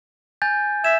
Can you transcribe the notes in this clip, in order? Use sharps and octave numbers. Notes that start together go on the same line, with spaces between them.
G#5 G6 A6
E5 G#6 E7